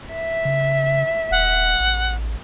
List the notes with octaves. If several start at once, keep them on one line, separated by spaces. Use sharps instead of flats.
E5
C#3
D#1 F#5
A1